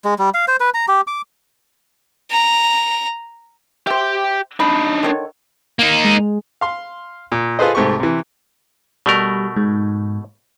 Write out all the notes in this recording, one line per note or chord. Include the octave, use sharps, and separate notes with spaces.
G#3
G3
F5
C5
B4
A#5
G4
D6
A#5
G4 C5 E5 G5
D4 D#4 B5
D3 D#3 C#5
A#3 D#4
G#3
F5 C6
A#2
F4 G#4 A4 B4 C5 D#5
C2 G#2 A3 G4 C#6
C3 E3
B2 G3 A3 A#4
G#2